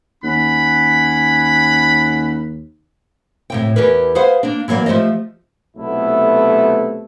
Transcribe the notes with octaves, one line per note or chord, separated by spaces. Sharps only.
D#2 C#4 F#5 B5
A2 C3 G5
E2 G4 G#4 A#4 B4
G#4 B4 C5 F5 F#5
A#3 D4
E3 F#3 A#3 D5
F3 A3 G4 C5 D#5
B1 C3 A3 B3 E4 A4